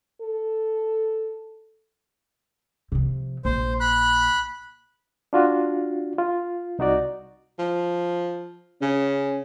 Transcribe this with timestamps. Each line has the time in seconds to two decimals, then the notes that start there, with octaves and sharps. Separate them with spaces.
0.21 A4
2.92 C3 F3
3.45 A#1 C5
3.80 B5 F#6
5.33 D4 F4 F#4
6.18 F4
6.79 C2 D#4 F#4 D5
7.59 F3
8.82 C#3 C#4